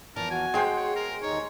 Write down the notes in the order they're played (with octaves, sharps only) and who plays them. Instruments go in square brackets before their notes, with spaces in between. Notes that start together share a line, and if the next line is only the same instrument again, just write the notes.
[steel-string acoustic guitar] E2 F3 A5 [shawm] A#4
[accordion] F#4 [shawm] G#5
[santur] G#3 C5 [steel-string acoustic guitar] G#4 G5
[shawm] C#5
A#4
[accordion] D#2 D#4 [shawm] C#5